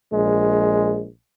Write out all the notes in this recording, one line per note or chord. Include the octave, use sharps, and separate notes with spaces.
A#1 G#3